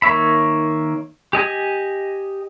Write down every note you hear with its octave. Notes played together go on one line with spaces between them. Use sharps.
D#3 A#3 C#5 E5 B5
G4 D#5 G#5 D#6